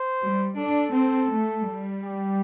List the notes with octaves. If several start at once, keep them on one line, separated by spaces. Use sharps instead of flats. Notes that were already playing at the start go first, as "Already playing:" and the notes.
Already playing: C5
G3
D4 A4
C4
A3
G3
G4